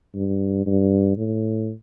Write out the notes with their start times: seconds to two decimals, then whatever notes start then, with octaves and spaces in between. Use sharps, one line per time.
0.15 G2
0.66 G2
1.17 A2